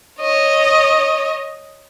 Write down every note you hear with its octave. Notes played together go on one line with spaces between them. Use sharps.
C#5 D#5